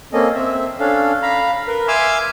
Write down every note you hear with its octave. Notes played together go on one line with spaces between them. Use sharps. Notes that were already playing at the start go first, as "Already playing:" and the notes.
A#3 C4 C#4 A4 D#5
C4 E5
C#4 D4 A4 F5
F5 A#5 B5
A#4 B4
E5 G#5 C6 D6 E6 F6